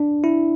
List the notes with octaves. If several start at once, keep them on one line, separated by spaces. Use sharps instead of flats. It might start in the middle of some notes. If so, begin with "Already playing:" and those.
Already playing: D4
E4